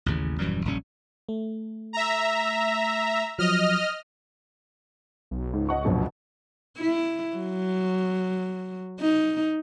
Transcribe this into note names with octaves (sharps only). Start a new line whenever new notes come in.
A1 D#2 C#3
D#1 F#2 E3 G3
F1 A#1 G3 C#4
A3
E5 A#5
F3 F#3 D#5 F6
B1
C#2 G#2
D#5 F#5 C#6
A#1 F#2 B2
E4
F#3
D#4